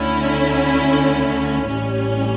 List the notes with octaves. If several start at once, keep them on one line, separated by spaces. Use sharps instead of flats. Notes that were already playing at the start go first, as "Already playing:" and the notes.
Already playing: D2 D3 A3 C#4 E4
A1 A2 G3 C#4